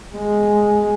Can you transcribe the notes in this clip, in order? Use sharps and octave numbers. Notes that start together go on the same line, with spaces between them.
G#3